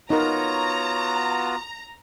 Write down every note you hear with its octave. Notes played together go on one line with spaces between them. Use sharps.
B3 D#4 F4 F#4 A#4 C#5 A#5